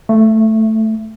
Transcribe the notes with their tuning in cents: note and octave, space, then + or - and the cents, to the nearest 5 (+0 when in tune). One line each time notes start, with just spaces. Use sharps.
A3 +0 E5 +25